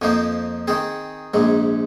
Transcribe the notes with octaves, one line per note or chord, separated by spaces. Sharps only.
F2 F3 A#3 D#4 C5
D#3 C4 G#4
A#1 G#2 G#3